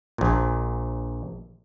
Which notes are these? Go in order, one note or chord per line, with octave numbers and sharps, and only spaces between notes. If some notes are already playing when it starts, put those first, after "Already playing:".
A#1 A#2